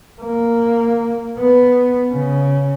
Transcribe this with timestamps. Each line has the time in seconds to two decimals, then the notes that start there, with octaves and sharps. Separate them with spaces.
0.22 A#3
1.38 B3
2.12 C#3